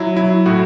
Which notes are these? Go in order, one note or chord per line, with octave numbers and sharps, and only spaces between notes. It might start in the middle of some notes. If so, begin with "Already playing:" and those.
Already playing: F#3 E4
F#3 E4
A2 F#4